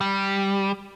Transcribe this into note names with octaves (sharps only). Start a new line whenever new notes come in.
G3